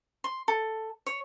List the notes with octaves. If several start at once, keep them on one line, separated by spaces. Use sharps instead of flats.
C6
A4
C#5